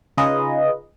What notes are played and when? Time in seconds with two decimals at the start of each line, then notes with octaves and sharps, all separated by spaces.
0.17 C#3 D#4 F4 G#4 B4 D#5